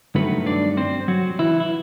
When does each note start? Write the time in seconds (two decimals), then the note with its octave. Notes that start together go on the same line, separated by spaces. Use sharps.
0.15 G2 D#3 F#3 A3 B3 B4
0.46 D4 D5
0.77 C4 C5
1.08 F#3 F#4
1.39 E3 E4
1.60 E4